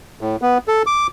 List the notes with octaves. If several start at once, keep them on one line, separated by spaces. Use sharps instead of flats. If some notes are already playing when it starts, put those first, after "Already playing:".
A2
B3
A4
D6